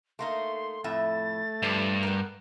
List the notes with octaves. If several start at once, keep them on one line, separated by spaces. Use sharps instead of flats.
A3 A#3 D#4 C6
F2 A2 A3 E5 A6
G2 F3 G3
B3 A#4